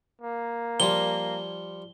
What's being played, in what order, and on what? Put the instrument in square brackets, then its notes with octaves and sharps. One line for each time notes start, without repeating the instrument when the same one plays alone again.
[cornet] A#3
[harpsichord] F3 G3 F4 [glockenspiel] G7